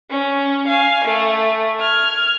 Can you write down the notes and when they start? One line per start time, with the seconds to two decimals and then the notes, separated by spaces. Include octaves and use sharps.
0.10 C#4
0.67 F5 G#5
1.05 A3
1.80 F6 G#6